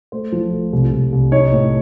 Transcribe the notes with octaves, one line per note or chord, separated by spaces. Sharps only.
A3 C5
F3
A3
C2
C2
C2
D#4 C#5
A2